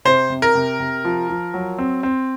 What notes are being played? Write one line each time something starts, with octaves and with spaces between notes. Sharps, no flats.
C3 C5
C3
A#4
C3
C3
F3
F3
F#3
C4
C4